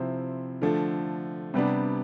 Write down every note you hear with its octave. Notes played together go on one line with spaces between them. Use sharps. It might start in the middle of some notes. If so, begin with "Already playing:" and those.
Already playing: C3 F3 C4 E4
D3 F3 A3
C3 G3 B3 D4